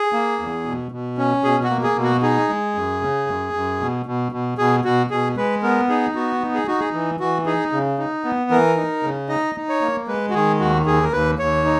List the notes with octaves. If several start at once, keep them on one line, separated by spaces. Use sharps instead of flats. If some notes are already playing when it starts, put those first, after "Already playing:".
Already playing: G#4
A#3
E2
B2
B2
C#4
B2 G#4
F#4
A#3
G#4
B2
F#4
D#4 G#4
G#3
F#2
C#3
F#2
F#2
B2
B2
B2
B2 G#4
B2 F#4
B2 G#4
G#3 B4
B3 A#4
D#4 G#4
B3 F#4
D#4
G#4
D#4 F#4
G#4
E3
E3 F#4
D#4 G#4
C#3
D#4
B3
E3 A#4
D#4
C#3
D#4 D#5
D#4
C#5
A#3
G#3 B4
F#4
D#3 G#4
D#2 F#4
D#2 G#4
A#4
D#2 B4
D#2 C#5
D#4